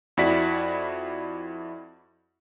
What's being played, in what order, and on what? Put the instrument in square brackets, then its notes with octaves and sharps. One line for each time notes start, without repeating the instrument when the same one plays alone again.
[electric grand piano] F2 E4 F#4 D5 B6